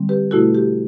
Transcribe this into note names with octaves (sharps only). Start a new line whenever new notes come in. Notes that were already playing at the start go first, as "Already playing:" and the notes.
Already playing: D3 G3 C4
G4 B4
B2 A3 E4 F#4 A4
G4